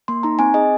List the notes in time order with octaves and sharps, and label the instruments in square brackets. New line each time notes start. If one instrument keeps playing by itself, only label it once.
[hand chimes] A#3 C6
D#4 A#5
C4 G#5
G#4 D#5